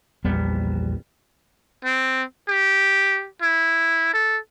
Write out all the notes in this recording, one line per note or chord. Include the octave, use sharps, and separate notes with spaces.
A#1 E2 G3 B3
C4
G4
E4
A4